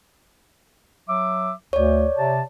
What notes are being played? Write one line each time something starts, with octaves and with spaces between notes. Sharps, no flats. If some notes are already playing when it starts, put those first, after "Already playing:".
F#3 E5 D6
D2 C#5 D5
C3 A5